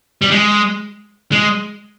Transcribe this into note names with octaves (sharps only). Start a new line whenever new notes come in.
G3
G#3
G#3